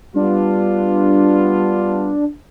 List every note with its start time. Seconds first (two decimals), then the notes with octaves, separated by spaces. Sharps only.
0.16 G3 B3 D4 F4